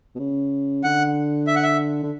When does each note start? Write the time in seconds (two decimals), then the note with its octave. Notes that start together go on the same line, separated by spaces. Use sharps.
0.15 B2
0.19 C#3
0.84 D3 F#5
1.47 E5
1.56 F#5
1.63 E5
2.03 D3